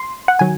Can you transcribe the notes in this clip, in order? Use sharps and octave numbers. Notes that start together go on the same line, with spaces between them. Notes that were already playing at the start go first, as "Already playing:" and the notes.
Already playing: C6
F#5
D#3 F#3 G#5